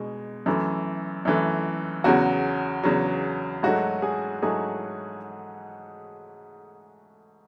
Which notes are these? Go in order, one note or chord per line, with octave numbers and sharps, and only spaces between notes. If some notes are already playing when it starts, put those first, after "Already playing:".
Already playing: B2 G#3
F#2 E3 A3
F#2 E3 A3
E2 C#3 F#3 F#4
E2 C#3 F#3
G#2 F#3 A3 F#4
G#4
G#2 F#3 A3 G#4